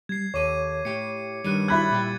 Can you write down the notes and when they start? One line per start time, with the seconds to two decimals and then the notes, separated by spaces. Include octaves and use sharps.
0.09 G3 G#6 C7
0.34 D#2 A4 C#5 C#6 D6 D#7
0.85 A2 G4 C#7
1.44 G2 D#3 G3 F#6 C#7 D#7
1.68 E4 B5 F#6 G#6 A6
1.91 A#2 G3 G4